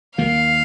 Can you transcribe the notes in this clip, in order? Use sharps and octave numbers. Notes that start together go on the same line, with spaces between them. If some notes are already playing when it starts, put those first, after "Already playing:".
D#2 D#3 A#3 F5